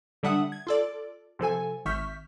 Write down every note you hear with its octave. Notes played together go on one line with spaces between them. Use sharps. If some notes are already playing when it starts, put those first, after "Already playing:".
D3 G3 D4 E5 F#5 D#6
G#6
F4 A4 D5
C3 F3 A4 G#5
G#1 E5 C#6 F6 G6 B6